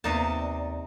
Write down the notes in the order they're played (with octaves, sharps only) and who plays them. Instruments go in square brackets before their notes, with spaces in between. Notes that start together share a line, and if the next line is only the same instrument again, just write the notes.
[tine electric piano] D#2 B3 [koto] C3 D#4 A5 [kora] A#3 B4 [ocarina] D5